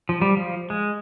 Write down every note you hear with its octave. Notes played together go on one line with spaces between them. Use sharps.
F3
G3
F3
G#3